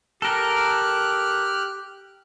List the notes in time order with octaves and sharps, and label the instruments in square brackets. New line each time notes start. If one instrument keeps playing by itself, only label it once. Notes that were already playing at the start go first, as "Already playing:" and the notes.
[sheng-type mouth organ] G4 F6 F#6 [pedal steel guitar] A4 A#4